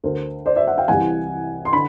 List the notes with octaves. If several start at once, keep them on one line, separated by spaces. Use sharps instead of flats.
D2 D3 A#4 C5
C5 D5
D5 E5
E5 F#5
F5 G5
C2 C3 E3 F#5 G#5
C6
D3 B5